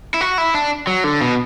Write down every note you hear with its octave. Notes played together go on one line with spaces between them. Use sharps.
E4
F#4
E4
D4
F#3
D3
B2